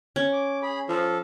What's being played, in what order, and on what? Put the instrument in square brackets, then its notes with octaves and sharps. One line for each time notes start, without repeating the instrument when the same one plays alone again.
[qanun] C#4
[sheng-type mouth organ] D6
G#4 B5
[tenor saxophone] F3 [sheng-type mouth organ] A4